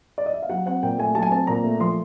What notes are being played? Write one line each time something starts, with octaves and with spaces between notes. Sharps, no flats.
D5
D#5
E5
F5
F#3 F#5
C4 F#5
A#2 G5
A3 G#5
F#3 A5
G#5
C4 A5
A#2 A#5
A3
F3 C6